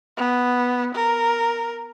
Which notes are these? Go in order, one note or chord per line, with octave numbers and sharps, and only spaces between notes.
B3
A#4